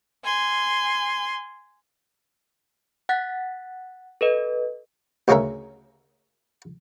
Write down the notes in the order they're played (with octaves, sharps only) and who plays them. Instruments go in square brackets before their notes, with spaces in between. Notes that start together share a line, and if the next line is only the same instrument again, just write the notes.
[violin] G#5 C6
[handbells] F#5 F#6 A6 B6
A4 B4 D#5
[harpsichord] D2 C#3 G#3 C#4 A#4 E5